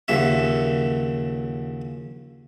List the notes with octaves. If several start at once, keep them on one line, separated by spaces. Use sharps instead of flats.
A#1 D#2 C#3 F#3 E5